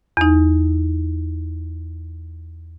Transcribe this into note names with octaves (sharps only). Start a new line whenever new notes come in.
E2 D#4